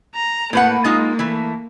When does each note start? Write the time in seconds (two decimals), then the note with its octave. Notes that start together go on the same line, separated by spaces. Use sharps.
0.15 A#5
0.53 A2 A#3 B4 F#5
0.84 G#3 D#4 F4
1.19 E3 A3